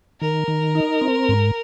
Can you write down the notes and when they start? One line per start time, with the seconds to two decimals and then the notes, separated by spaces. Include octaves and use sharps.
0.21 D#3 A#4
0.48 D#3
0.75 D#4
1.01 C4
1.29 G#2